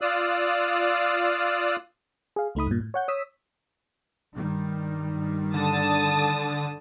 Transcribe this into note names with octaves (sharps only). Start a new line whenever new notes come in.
F4 D5 F5 D#6 E6 F#6
G#4 F5
C#2 A3 D#4 B5 D#6
G2 A#2
A2
C#5 F#5 G6
C#5 D#6 E6 B6
G2 D#3 G3
D3 A5 D#6